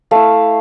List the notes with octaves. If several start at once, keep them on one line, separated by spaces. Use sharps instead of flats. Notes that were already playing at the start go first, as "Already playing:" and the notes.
A3 E4 F5